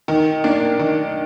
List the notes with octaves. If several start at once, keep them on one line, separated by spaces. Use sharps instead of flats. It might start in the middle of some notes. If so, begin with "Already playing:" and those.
D#3
A#3 D4
D#3